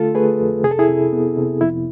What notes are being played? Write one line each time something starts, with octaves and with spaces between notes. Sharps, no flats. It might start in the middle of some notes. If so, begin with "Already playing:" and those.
Already playing: D3 A3 F4 A4
A3 G#4 B4
F2
C3 G#4
A4
E4 G#4
C3
B3
C3
F2 E4